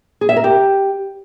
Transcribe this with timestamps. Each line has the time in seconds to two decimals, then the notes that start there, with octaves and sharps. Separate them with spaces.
0.21 G#4
0.29 E5
0.36 A#4
0.44 G4